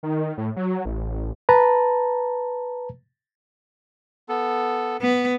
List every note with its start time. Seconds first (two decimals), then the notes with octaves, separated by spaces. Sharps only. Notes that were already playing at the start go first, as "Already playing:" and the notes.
0.03 D#3
0.38 A2
0.56 F#3
0.85 A1
1.49 B4 A5 A#5
4.29 B3 A4
5.02 B3